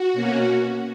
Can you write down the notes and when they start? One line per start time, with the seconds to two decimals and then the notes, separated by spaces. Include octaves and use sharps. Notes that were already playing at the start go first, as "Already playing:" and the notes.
Already playing: F#4
0.13 B2 A#3 C#4